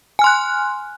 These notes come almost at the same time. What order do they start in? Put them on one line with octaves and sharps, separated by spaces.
G#5 F6 C6 F#6